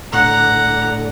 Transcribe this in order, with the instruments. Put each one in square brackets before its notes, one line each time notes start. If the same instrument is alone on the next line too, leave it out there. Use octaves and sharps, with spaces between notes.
[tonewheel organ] A2 D3 [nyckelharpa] F#5 A#5